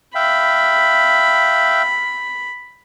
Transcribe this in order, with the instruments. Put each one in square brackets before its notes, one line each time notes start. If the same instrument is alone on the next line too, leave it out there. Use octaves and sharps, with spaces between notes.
[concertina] E5 F5 G5 [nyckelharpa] B5